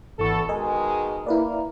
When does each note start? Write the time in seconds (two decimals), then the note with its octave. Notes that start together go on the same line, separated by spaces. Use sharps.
0.19 G#1 D2 E3 B3 A4 C#6
0.49 B2 D#3 G#3 A#4 D#5 G#5
1.26 A#3 E4 B4 D5